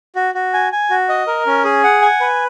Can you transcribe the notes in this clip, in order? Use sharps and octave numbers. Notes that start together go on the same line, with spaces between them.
F#4
F#4
G#5
G#5
F#4
D#5
A#4
C#4
G#4
F#5
G#5
B4